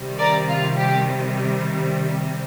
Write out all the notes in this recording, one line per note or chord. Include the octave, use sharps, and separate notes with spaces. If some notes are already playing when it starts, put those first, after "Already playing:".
Already playing: C3 D#3 G3
A#4 D5
F4
G4